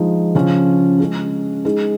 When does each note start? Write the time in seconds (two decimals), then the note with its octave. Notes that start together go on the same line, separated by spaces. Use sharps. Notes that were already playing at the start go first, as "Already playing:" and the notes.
Already playing: F3 G#3 D#4
0.35 C#3 F3 C#4
1.00 G#3 C#4 G#4
1.65 G#3 D#4 G#4